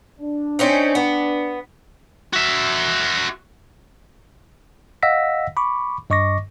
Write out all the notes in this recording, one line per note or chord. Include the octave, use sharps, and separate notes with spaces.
D4
C4 C#4 D#4
B3
F#4 E5
D#5 F5 F#5 E6 A#6 B6
B5 C#6 D6
G2 D#5 C#6 D6 A#6